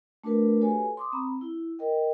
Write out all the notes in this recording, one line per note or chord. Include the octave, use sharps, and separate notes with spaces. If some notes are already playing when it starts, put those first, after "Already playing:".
A3 D4 F#4 A#4 B4
F#4 G4 A4 B4 C#5 G#5
C6 D6 D#6
C4 A#5 B5
E4
A#4 D#5 G5